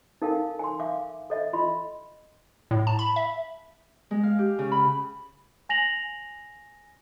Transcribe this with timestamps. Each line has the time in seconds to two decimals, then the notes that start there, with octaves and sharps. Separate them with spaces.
0.22 D#4 A4 A#4 F5 G5 G#5
0.59 G#5 C6
0.80 E5 F5 D6
1.30 A4 D#5 E5
1.53 F4 D#5 B5 C6
2.71 A2
2.87 A5
2.99 B5
3.16 E5
4.11 G#3
4.23 F5
4.39 G4
4.59 C#3
4.72 B5
5.69 G#5 A#6 F7 F#7